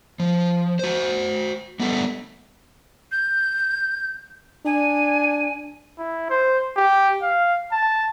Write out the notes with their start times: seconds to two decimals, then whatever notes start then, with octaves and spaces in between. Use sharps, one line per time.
0.19 F3
0.79 F#4 C5
1.80 G3 A3 B3 D4 A4 E5
3.12 G6
4.66 D4 G#5
5.98 E4
6.30 C5
6.77 G4
7.22 F5
7.72 A5